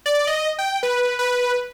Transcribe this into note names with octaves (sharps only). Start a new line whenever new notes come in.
D5
D#5
G5
B4
B4